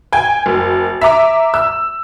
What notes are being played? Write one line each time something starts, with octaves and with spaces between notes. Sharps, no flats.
G5 G#5 G#6
F#1
E5 A#5 D6
E6